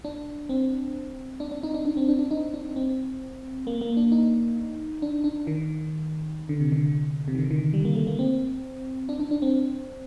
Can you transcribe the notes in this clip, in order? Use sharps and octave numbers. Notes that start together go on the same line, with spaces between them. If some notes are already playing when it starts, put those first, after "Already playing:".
D4
C4
D4
D4
D#4
D4
D4
C4
D4
D4
D#4
D4
C4
A#3
A#3
D4
D#4
D4
D4
D#3
D3
C3
D3
C3
D#3
D3
D#3
G3
A#3
A3
A#3
C4
D4
D4
D4
C4